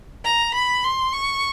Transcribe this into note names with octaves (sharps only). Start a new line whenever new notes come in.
A#5
B5
C6
C#6